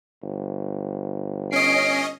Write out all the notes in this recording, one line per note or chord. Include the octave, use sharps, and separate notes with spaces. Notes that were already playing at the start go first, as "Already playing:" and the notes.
G1
C#4 D#5 C7 D7